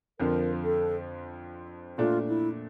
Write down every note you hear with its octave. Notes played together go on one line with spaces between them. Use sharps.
F2 D3 F3 C4 A#4
A4
A#2 A3 D4 F4
E4